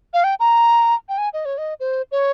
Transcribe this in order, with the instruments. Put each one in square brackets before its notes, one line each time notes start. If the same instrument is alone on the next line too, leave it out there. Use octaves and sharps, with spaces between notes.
[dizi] F5
G5
A#5
G5
G#5
D#5
C#5
D#5
C5
C#5